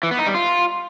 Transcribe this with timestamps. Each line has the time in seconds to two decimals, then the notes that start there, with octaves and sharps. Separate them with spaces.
0.03 E3
0.11 B3
0.19 D#4
0.27 G3
0.35 F4